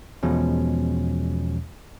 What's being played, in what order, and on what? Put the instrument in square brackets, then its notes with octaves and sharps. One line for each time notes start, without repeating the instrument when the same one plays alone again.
[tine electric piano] E2 B2 F3 G#3 C#4